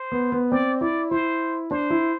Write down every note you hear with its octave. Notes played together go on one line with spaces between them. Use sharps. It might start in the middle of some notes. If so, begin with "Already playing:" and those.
Already playing: C5
B3
B3
C4 D5
E4 D5
E4 C5
D4 C5
E4